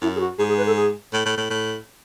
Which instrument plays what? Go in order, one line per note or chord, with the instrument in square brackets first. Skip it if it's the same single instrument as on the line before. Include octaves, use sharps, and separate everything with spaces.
[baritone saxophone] F#2 [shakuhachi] E4
[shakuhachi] G#4
F#4
[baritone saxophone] G#2 [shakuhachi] G#4
[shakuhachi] G#4
B4
A4
G#4
[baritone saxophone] A2
A2
A2
A2